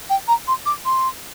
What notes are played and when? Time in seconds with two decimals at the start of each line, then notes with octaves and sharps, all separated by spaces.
0.09 G5
0.27 A#5
0.47 C6
0.65 D6
0.85 C6